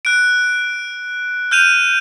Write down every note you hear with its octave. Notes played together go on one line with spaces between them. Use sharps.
F#6 D7
F6 G6 D#7 F7